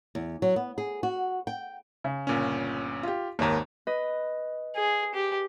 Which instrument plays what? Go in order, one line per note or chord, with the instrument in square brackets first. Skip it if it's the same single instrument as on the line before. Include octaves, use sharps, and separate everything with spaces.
[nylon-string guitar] E2
F#3
B3
G#4
F#4
G5
[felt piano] C#3
[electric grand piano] G1 A#2 C#4
[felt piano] F4 G4
[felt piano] G#1 C#5 A#5 [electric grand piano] D#2 A#3
[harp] B4 D#5
[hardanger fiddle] G#4
G4